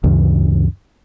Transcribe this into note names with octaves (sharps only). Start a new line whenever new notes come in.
D2 G2 C#3 E3